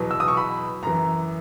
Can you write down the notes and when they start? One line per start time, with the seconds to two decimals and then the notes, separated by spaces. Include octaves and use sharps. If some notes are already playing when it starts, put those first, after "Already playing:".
Already playing: E2 B2 F#3
0.11 E6
0.20 D#6
0.28 C#6
0.37 B5
0.83 F#2 E3 A#5